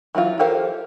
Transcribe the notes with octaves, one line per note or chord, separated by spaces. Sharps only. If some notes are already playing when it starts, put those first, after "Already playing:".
E3 F#3 E4 F4
G4 A4 A#4 C5 F5